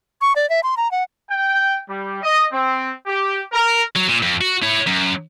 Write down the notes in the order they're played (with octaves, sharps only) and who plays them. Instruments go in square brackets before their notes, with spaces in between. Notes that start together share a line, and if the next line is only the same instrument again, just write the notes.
[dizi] C#6
D5
E5
C6
A#5
F#5
[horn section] G5
G3
D#5
C4
G4
A#4
[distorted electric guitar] F#3
A#2
F2
F#4
E4 C#5
F#2